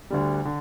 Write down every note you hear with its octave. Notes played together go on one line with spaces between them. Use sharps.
D2 D3 G3
D3